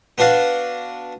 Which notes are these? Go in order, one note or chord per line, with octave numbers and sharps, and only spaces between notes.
B3 D4 F#4 F5 A5